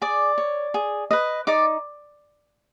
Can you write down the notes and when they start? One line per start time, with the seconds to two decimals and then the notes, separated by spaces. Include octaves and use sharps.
0.02 G#4 D5 D6
0.38 C#5
0.74 G#4
1.11 B4 D#5
1.47 D#4 D5 D6